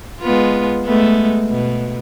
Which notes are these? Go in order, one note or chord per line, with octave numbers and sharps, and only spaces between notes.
G#3 B3 F4
G#3 A3 B3
B2